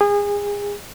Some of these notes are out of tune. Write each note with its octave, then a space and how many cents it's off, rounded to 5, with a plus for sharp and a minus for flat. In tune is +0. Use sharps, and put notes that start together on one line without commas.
G#4 -30